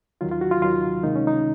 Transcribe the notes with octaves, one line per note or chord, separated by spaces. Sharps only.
D#2 D#3 F#3 F4
F4
F#4
F4
D#2 D#3 F#3 F4
C#2 C3 D#3 G#3 D#4
C#4
D#4